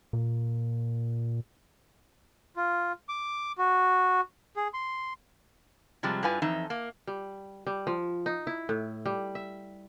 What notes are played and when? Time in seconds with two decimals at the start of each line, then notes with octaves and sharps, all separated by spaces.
0.13 A#2
2.56 F4
3.09 D6
3.58 F#4
4.56 G#4
4.74 C6
6.03 C3 F3 G3 G#3
6.23 G2 E4 F4 B4 G#5
6.42 F2 E3 D#4 E5
6.70 A#3
7.07 G3
7.67 G3
7.87 F3
8.26 D#4
8.47 E4
8.69 A2
9.05 G3
9.35 E5